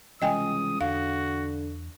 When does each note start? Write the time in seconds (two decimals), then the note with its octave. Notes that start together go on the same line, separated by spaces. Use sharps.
0.22 C#2 C3 E3 G3 D#5 G5 G#5 D#6
0.81 E2 D3 F#4 F5